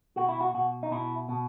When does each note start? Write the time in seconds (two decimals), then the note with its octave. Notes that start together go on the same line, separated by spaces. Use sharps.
0.16 B2 F#4
0.29 E4
0.41 F#4
0.54 B2 F#4
0.83 D#4
0.91 B2 E4
1.29 B2